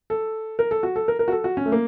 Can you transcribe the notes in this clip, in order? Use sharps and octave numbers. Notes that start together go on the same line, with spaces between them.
A4
A#4
A4
F#4
A4
A#4
A#4
F#4
A4
F#4
C#4
A3
A#3